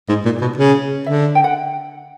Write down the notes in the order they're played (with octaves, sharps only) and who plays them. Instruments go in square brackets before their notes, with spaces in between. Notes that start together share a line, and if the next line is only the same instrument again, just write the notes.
[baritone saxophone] G#2 [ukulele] D#5
[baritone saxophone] A#2
B2
C#3
[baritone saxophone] D3 [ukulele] E5
[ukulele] G5
F#5